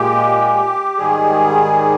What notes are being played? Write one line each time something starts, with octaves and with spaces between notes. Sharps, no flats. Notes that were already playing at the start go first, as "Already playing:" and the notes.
Already playing: A#2 G#3 G4
G#2 D#3 G3 G#4